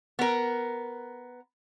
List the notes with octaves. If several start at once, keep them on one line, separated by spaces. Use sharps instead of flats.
B3 A#4